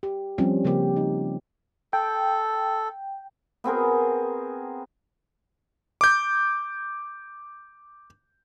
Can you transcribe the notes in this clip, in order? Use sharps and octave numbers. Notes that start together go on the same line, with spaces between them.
G4
F3 G3 C4 C#4
C#3 F3 A#3 G4
D#4
A4 G5
B3 C4 G#4 A#4
D6 G6